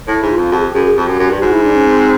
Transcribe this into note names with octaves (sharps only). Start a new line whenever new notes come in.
A2 E4
G#2
F4
F2
F2 F#4
G#4
G4
F#2 G#4
G#4
F2 G4
F#2
F#2
G2
G#2 F#4
E4
D4
C#4
C4